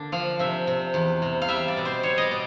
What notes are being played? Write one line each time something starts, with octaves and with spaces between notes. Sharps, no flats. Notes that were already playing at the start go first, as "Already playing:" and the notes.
Already playing: D3 A#3 D4
F3 F5
C3 E5
C3
E2
C3
F5
G3 E5
D5
B2
C5
G3 C#5
D5 D#5
B2